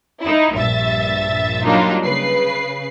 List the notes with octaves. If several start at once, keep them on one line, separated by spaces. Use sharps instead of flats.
D#4 E4
A#1 G2 E5 A6
F#3 G3 A#3 D4 D#4 F4
C#3 B4 C7